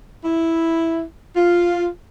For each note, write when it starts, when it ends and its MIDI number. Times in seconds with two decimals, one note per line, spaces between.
0.25 1.03 64
1.36 1.87 65